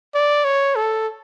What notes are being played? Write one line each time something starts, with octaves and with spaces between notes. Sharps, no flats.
D5
C#5
A4